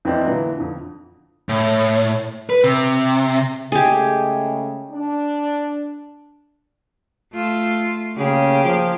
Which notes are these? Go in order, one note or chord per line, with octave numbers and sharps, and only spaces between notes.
F2 E3 C4 D4 D#4
A#2 D3 E3 F#3
F2 D3
A2
B4
C3
C#3 G#3 A3 G4 G#4
D4
A3 F4
C#3 A#3 G4 G#4
F3